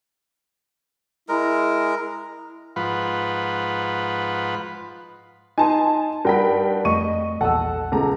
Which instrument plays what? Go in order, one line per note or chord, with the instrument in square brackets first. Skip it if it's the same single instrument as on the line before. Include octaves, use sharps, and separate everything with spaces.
[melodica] G#3 A#4 [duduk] E4
[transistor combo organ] G#2 F3 F4 B4 F#5 B5
[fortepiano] D#4 [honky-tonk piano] G#5 A5 C6
[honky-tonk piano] G2 G5 B6 [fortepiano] A#4 F#5 B5
[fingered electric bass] F2 A3 [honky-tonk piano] D#5 D#7 [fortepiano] C#6
[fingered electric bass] A#1 E2 [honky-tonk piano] A4 [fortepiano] F#5 A5 E6
[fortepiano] C#2 [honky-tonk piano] A4 A#5